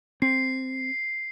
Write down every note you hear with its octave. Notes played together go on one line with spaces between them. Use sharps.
C4 C7